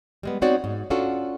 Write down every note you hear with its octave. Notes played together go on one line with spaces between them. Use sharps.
G3 G#3 B3
B3 C4 D#4 F#4 C#5 D5
G#2
C#4 D4 F4 F#4 A4